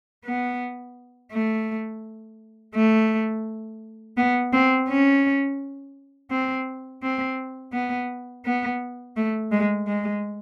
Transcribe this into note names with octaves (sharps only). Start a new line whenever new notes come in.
B3
A3
A3
B3
C4
C#4
C4
C4
B3
B3
A3
G#3
G#3